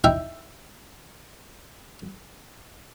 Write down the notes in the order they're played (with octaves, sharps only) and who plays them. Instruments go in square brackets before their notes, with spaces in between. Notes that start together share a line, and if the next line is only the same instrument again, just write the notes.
[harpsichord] D#4 E4 E5 G5